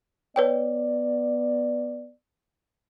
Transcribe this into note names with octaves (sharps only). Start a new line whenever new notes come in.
B3 B4 C#5 D5 G5